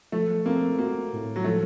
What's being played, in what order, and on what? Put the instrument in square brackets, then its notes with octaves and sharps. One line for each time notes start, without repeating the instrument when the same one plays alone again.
[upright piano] F3 [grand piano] A3
[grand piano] A#3 [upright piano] C4
[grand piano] A#3 [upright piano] F#4
[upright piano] A2
[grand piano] F#3
[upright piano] F3 [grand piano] A3